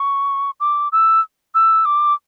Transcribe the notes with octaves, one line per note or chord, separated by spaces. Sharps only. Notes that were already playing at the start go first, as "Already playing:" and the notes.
Already playing: C#6
D6
E6
E6
D6